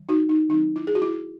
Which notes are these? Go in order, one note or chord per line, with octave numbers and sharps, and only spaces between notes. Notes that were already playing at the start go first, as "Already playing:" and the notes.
Already playing: D#3 F#3
D#4 F#4
D#4
D#3 F#3 C4 D#4
E4
G#4
F#4
E4